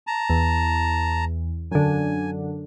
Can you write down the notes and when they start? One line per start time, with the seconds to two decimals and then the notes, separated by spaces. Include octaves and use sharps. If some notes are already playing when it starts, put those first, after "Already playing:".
0.07 A5 A#5
0.30 E2
1.72 F#2 D3 G#5